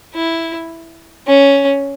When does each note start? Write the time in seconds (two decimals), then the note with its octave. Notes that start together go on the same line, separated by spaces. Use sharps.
0.14 E4
1.27 C#4